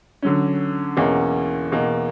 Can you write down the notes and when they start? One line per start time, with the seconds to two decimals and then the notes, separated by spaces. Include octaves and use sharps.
0.22 D3 F#3 C#4
0.97 E2 B2 A#3 C#4
1.72 E2 B2 A#3